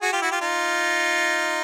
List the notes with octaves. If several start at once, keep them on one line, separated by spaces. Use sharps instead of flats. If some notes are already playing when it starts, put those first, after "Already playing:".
F#4 G#4
F4 G4
E4 F#4
F4 G4
D#4 F4